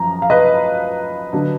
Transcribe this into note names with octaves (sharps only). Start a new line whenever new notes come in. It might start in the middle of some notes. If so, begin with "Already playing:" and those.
Already playing: F#2 F3 A#5
F5
B4 D#5
D3 F#3 B3